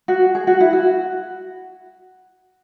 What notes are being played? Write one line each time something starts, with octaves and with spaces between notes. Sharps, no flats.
F#4
G#4
F#4
E4
F#4